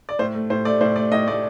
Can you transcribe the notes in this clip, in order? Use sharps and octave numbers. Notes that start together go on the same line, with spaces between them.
D5
A2 C5
A3
A2 C5
A3 D5
A2 C5
A3 D5
A2 D#5
A3 D5